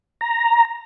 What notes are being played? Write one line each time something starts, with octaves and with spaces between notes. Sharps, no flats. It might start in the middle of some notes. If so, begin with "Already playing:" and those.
A#5